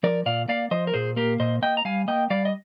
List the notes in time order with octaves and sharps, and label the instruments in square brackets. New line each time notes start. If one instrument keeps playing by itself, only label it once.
[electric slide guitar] F3 A#4 D5
A#2 D5 F5
A#3 D5 F5
F3 C5 D#5
A#4
A#2 G#4 C5
A#3 G4 A#4
A#2 C5 D#5
A#3 D#5 G5
A#5
G3 F5 G#5
A#3 D#5 G5
G3 D5 F5
D#5